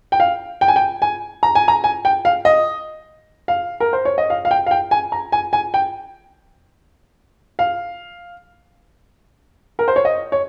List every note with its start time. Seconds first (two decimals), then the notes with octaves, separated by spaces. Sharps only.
0.12 G5
0.20 F5
0.61 G5
0.68 G#5
0.76 G5
1.02 G#5
1.43 A#5
1.55 G#5
1.68 A#5
1.84 G#5
2.05 G5
2.25 F5
2.45 D#5
3.48 F5
3.80 A#4
3.93 C5
4.05 C#5
4.18 D#5
4.30 F5
4.45 F5
4.51 G5
4.67 F5
4.71 G5
4.91 G#5
5.12 A#5
5.32 G#5
5.53 G#5
5.74 G5
7.59 F5
9.79 A#4
9.88 C5
9.96 C#5
10.05 D#5
10.32 C#5